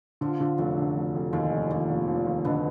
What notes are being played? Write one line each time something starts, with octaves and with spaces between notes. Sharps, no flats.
D3 F3
D3
F1 F#2 F#3
D3
F1
F1
D#2 G#2 G#3
F1
D#2 A#2 A#3
F1
F1
D#2
B2 D3 B3